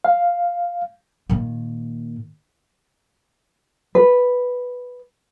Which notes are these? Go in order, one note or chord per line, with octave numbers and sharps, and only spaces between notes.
F5
A#2 D#3
B4